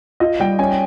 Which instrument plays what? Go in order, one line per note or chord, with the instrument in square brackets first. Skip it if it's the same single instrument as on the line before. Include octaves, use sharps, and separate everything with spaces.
[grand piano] F4 [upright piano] D#5
[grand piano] G3 [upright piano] G5
[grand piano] C#4 [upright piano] G#5